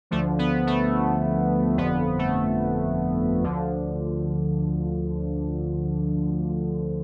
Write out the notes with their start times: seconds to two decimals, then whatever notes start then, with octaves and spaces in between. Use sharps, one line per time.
0.11 D2 D3 F3 A3
0.39 B3
0.67 A3
1.77 G1 F2 D3 F3 B3
2.19 A3
3.43 D2 D3 F3